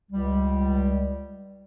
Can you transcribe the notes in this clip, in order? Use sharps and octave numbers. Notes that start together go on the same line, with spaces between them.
C#2 G3